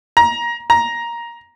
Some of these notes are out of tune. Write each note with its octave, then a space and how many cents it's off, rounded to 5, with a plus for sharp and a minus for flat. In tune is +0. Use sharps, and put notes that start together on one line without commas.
A#5 +20
A#5 +10